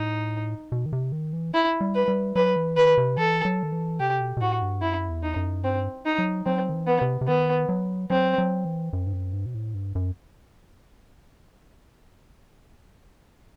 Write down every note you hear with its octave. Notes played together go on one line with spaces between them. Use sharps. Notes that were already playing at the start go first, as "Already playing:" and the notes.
Already playing: A2 D#4
B2
D#3
C3
D#3
E3
E4
G3
B4
G3
F#3 B4
E3
D#3 B4
C3
E3 A4
F#3
D#3
E3
C3 G4
B2
B2
A2 F#4
G2
F#2 E4
E2
D#4
F#2
G2 C4
D#4
F#3
F#3 C4
D#3
E3
B3
C3
C3
D#3 B3
F#3
F#3 C4
F#3
E3
F#2
G2
F#2
G2
B2
A2
G2
F#2